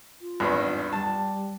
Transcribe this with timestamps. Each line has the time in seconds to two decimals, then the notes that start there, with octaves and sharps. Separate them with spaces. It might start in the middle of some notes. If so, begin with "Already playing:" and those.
0.20 F4
0.40 G#1 E2 G2
0.93 G3 A5